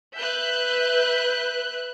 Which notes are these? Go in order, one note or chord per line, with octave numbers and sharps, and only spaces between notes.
B4 E5 F#6 G6